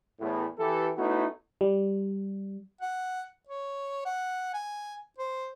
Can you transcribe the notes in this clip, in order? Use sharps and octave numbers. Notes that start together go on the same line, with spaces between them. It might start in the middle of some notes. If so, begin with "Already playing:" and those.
E2 A2
E3 G4 A4
A3 B3 C#4 D#4 E4 F#4
G3
F#5
C#5
F#5
G#5
C5